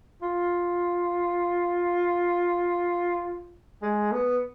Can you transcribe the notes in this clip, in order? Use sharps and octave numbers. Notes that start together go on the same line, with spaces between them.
F4
G#3
B3